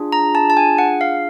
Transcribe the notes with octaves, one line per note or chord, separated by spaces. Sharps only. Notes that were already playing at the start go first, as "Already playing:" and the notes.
Already playing: D4 F4 G#4
A#5
A5
A5
G#5
F#5
F5